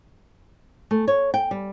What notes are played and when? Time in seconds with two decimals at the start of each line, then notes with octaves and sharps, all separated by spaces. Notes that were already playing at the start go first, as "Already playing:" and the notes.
0.91 A3
1.08 C#5
1.34 G5
1.51 G3